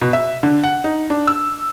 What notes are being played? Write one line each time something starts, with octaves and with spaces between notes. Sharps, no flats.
B2
E5
D3
F#5
D#4
D4
E6